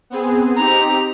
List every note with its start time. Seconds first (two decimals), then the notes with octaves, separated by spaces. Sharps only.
0.10 B3 C4 G#4
0.56 C4 D#4 G4 A#5